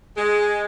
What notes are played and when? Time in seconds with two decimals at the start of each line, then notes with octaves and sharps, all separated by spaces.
0.16 G#3